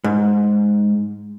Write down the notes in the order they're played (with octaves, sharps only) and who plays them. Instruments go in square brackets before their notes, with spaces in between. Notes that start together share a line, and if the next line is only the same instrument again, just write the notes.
[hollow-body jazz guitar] G#2